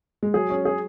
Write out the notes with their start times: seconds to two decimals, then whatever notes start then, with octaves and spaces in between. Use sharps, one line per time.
0.23 G#3
0.34 F#3 G#4
0.50 C#4
0.65 G#4